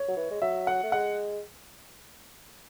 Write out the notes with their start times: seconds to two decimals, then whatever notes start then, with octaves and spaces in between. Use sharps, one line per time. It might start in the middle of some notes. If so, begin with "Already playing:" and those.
Already playing: C#5
0.08 F#3
0.17 E3
0.31 G#3
0.42 F#3 E5
0.67 F#5
0.83 A3
0.92 G#3 F#5